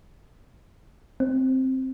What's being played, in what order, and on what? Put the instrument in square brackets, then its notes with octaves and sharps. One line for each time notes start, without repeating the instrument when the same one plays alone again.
[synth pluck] C4